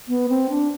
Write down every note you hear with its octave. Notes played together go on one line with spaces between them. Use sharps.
B3
C4
D4